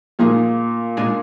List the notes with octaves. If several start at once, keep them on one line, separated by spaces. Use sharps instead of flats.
A#2 F3 G#3 D#4 G#4
A#2 G#3 D4 G#4